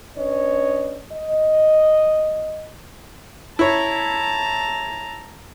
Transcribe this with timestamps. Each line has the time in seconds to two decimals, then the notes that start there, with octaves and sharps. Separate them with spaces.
0.17 C#4 D4 B4 C#5 D#5
1.12 D#5
3.59 E4 C#5 A5 A#5